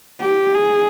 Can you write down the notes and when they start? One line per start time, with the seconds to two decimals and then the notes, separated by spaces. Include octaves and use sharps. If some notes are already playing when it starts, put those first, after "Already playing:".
0.21 G4
0.54 G#4